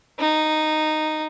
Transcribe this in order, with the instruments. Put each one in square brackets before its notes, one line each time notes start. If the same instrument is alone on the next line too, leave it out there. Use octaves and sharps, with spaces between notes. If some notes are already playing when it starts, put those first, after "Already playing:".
[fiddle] D#4